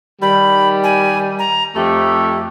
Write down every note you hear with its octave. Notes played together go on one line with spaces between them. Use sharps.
D#3 G3 B5
G#5
A#5
F2 A3 G4